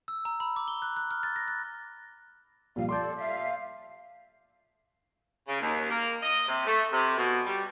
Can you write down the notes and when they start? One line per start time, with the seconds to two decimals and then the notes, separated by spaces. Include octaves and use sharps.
0.08 E6
0.25 A#5
0.40 B5
0.56 D6
0.68 G7
0.82 F#6
0.97 F#6
1.11 F6
1.23 A6
1.36 A#6
1.48 F#6
2.76 A#2 F3 G3 F5
2.89 A4 D5 C6 D6 G6
3.17 E5 F5
5.48 C#3
5.61 D#2
5.90 A#3
6.23 D#5
6.48 C3
6.66 A3
6.93 C3
7.18 B2
7.46 G3